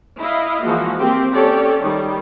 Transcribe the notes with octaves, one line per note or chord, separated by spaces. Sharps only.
E4 D#5 F5
E3 F3 G#3 A#3 F#4
A#3 C4 G4
C#4 G4 A4 C#5 D5
D#3 G3